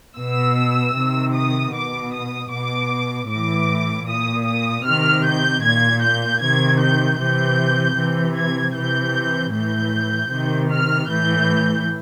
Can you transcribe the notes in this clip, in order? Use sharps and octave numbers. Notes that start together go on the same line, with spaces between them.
B2 E6
C3 D#3
D#6
B2 D6
D#6
B2 D6
A2 E3 D6
A#2 D#6
D#6
C3 D#3 F6
G6
A#2 G#6
G6
C3 D#3 G#6
G6
C3 E3 G6
C3 E3
G#6
C3 E3 G6
A2 E3 G6
C3 D#3
F6
A2 E3 G6